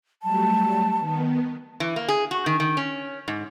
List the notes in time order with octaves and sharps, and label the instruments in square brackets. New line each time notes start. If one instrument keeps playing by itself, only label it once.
[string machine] F#3 G3 A3 [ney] A5
[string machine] D#3 B3
[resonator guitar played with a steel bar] E3
A#3
G#4
F#4
D#3
D#3
C#4
G#2